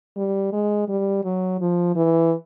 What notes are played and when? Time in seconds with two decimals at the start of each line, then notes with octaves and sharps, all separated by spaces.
0.16 G3
0.53 G#3
0.88 G3
1.24 F#3
1.60 F3
1.96 E3